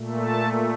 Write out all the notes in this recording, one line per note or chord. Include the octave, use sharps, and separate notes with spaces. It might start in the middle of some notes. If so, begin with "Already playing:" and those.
Already playing: A#2 A3
A5